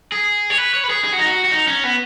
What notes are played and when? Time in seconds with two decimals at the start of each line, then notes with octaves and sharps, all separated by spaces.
0.12 G#4
0.50 C#5
0.58 B4
0.74 C#5
0.84 B4
0.90 G#4
1.05 G#4
1.12 F#4
1.19 D#4
1.26 F#4
1.45 F#4
1.51 D#4
1.68 C#4
1.84 B3